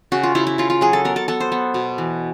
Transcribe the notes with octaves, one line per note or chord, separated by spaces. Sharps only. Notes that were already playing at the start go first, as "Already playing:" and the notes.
C#3 F#4
F4
C#3 E4
E4
C#3 F4
F4
F#3 G#4
A4
B3 A#4
A4
B3 A4
C5
B3
B2
E3